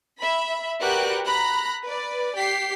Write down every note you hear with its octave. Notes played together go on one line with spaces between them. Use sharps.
E5 B5
F#4 G4 A#4 B4 D5 F#6
A#5 B5 F#6
B4 D5
G4 B6 C7